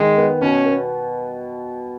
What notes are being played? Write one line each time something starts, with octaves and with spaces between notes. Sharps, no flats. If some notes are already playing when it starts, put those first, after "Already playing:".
Already playing: D#3 G#3
B3
B2 C#4
B3